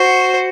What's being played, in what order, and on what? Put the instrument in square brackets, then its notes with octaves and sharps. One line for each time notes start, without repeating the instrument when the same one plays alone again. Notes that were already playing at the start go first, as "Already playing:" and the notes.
Already playing: [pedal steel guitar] F#4 [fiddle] C5